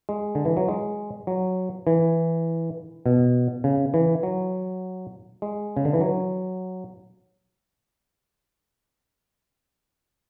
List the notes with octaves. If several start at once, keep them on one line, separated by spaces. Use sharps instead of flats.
G#3
D3
E3
F#3
G#3
F#3
E3
B2
C#3
E3
F#3
G#3
C#3
D3
E3
F#3